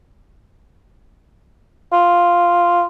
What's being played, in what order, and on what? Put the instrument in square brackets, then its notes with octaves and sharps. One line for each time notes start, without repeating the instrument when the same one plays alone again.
[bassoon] F4